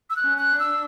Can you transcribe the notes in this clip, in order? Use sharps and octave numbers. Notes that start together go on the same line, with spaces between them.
E6
F#6
C#4
F#6
D4
E6